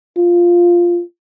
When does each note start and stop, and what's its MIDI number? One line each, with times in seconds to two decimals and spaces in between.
0.17 1.01 65